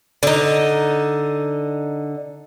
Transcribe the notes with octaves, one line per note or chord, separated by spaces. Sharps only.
D3 D#4